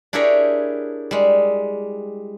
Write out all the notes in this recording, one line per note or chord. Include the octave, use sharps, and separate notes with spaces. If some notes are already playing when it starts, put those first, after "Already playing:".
D4 E4 G4 G#4 A#4 C#5
G3 G#3